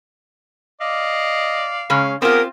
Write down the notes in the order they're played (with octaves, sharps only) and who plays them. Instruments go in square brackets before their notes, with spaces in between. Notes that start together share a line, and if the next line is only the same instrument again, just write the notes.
[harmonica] D5 F5 [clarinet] D#5
[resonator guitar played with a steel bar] C#3 G#3 C#4 [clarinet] F5
[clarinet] B3 [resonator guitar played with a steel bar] C4 F4 [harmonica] G4 G#4 D#6 [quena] A#4